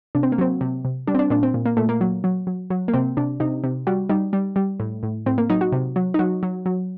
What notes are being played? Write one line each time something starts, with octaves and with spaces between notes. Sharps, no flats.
C3 D4
C4
A#3
F#3 C4
C3
C3
G3 D4
C4
D4
A#2 D4
C4
A#2
A#3
A#2 A3
A#3
F#3
F#3
F#3
F#3
A#3
C3 C4
C3 D4
C3 D#4
C3
G3 F#4
G3 D#4
G3
G3
A2
A2
A2 C4
A#3
F#3 D#4
F#4
C3
F#3
D#4
F#3 F#4
F#3
F#3